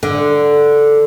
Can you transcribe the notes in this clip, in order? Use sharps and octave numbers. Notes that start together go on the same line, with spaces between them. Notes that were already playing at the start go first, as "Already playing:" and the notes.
D3